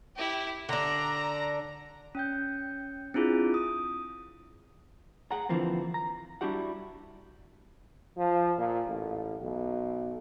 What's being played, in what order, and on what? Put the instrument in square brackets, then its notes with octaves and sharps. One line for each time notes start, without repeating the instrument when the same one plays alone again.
[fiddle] E4 G4
[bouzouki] D3 D4 [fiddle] A#5
[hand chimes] C#4 G5 G6
C4 D4 E4 F4 G#4
D#6
[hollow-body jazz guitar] G#4 F#5 A#5
D3 E3 F3 A#3 C4
A#5
G3 D4 E4 F#4 G4 F#5
[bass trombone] F3
A#2
A1
B1